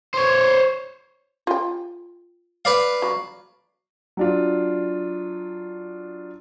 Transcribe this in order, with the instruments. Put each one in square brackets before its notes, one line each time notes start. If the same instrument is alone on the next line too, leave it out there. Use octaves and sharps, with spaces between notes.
[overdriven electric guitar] C5 C#5
[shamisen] F4 G5
[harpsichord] B4 D5 F5
[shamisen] F#3
[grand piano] F#3 D4 F4